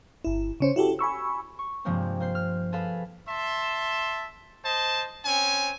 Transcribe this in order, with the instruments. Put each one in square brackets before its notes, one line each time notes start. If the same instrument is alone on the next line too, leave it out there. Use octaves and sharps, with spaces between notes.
[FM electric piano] G1 E4
C#3 C#4 C5
E4 F#4 G4 A4
G#5 B5 C#6 E6
[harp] C#6
G2 C3 F3 G#3 A#3 C4
A#3 C5 C7
F6
G#4 A4 B4 F5 B5
[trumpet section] E5 A5 C6
C5 D#5 A5
C4 C#4 G#5